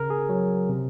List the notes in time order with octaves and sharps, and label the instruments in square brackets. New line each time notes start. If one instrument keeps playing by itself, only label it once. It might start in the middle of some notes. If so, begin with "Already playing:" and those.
Already playing: [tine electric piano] C#3 A#4
G#4
F#3
C3